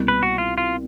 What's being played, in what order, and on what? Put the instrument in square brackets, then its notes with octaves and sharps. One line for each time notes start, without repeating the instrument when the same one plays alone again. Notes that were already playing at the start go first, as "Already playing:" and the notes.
Already playing: [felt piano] C2 B2 G3 A#3
[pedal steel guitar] B4
F#4
F4
F4